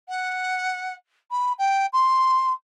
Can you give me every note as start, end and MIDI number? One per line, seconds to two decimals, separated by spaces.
0.08 0.94 78
1.31 1.53 83
1.58 1.86 79
1.93 2.53 84